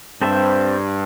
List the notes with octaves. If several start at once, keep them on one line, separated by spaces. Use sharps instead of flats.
G2 C4 A4 C5 E5